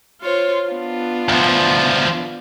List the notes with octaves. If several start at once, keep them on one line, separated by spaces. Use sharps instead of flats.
F4 C5 C#5
B3 D4 F4
D2 F3